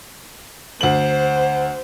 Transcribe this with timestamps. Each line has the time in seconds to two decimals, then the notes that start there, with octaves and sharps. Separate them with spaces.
0.81 D2 C5 F#7